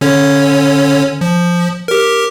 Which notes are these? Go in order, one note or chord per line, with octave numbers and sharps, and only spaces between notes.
D3 C#4 C#5
F3
G4 A#4